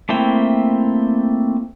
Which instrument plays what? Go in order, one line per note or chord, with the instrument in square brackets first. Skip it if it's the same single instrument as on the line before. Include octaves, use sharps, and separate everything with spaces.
[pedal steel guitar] A3 A#3 C4 E4 G5